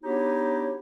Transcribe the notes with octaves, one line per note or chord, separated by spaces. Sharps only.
B3 D4 D#4 F#4 G4 C#5